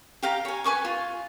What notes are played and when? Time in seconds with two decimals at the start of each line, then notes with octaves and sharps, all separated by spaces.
0.23 G4 F5 G5 A#5
0.45 C#5 G#5
0.64 B4 G#5 C#6 D6
0.85 F4